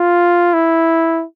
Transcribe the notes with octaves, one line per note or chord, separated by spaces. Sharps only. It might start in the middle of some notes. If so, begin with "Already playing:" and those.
Already playing: F4
E4